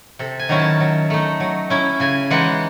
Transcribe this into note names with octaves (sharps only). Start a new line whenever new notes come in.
C3 A4
G#5
D#3 F#3 C#4 E4
A5
F#3
A3 D#4
F#3
C#4 E4
C#3 G#5
E3 G#3 D#4 F#5